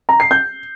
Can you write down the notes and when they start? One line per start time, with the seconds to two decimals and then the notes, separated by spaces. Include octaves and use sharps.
0.09 A#5
0.20 C7
0.31 G6